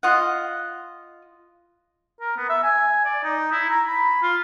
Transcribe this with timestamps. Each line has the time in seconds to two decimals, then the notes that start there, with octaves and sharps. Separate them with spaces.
0.03 F4 D#5 F#5
2.20 A#4
2.36 B3
2.49 E5
2.63 G#5
3.05 D5
3.24 D#4
3.52 E4
3.70 A#5
3.88 B5
4.22 F4